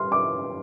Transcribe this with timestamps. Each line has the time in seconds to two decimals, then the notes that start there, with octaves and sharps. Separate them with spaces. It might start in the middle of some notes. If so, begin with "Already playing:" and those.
Already playing: G3 C6 F6
0.12 D6